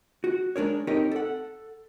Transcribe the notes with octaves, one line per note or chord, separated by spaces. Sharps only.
F#4
G#3 D4 A#4 C#5
C4 D#4 G4 A#4 C#5 D#5
A4 F#5